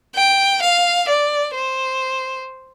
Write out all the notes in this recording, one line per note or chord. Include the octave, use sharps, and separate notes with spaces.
G5
F5
D5
C5